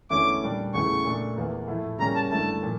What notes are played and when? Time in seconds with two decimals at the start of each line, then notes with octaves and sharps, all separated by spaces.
0.10 E2 D3 A3 C#4 E4 D6
0.43 A#2 G3 D4
0.74 E2 C#3 E3 A3 E4 C#6
1.04 A#2 A3 D4
1.36 E2 E3 A#3
1.68 A2 F3 A3 E4
1.99 C#3 G3 A#3 C#4 A#5
2.15 A5
2.30 G2 D3 A3 E4 A5
2.63 A#2 F3